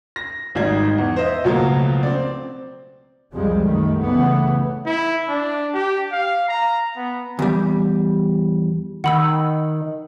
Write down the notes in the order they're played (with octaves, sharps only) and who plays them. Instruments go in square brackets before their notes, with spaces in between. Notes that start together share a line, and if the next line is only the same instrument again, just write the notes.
[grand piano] A#6
G#1 G#2 G3 D#4 G#6
E2
C5 D#5 E5
C#2 B2 F3 F#3 A3 A#3
C4 D5
[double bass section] C2 F2 F3 G3 G#3
F#2 D#3 A3
C#3 E3 A3 B3
[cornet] E4
D4
G4
F5
A#5
B3
[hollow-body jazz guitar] E2 G3
[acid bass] D#3 [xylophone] F#5 B5 E6